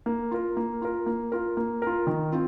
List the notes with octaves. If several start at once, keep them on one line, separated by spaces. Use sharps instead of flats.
A#3
F4 A#4
A#3
F4 A#4
A#3
F4 A#4
A#3
F4 A#4
D#3
C4 F4